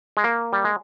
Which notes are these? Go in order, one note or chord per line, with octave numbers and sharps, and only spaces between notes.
G#3
A#3
G3
G#3